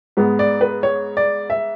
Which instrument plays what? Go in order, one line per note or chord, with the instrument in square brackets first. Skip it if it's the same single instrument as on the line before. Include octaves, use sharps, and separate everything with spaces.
[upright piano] G#2 G#3 B3
D5
B4
C#5
D5
E5